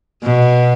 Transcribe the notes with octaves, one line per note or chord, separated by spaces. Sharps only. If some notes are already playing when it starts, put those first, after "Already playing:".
B2